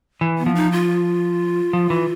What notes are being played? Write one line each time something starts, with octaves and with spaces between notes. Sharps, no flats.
E3
B3
F3
D#4
F4
F3
E3